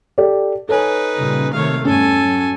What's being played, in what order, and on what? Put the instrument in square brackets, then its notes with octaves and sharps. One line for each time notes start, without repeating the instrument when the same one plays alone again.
[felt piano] G4 A4 D5
[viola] D#4 B4 [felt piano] A4 C#5 G#5
[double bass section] A#2 C#3 G3
[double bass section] C3 D#3 A3 [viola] C#5 F5
[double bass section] E2 G2 [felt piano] C#4 [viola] A4 G#5
[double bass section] F#3